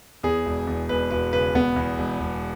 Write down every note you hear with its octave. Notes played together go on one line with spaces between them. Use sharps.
E2 G#4
E1
E2
E1 B4
E1 B4
C#3 B4
E1 B3
E2
E1
E1